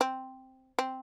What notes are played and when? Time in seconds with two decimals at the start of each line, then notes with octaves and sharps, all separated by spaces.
0.01 C4
0.79 C4